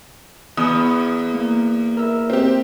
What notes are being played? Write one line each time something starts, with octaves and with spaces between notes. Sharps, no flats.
E2 B3 D#6
A#3
A#4 E5
C4 G4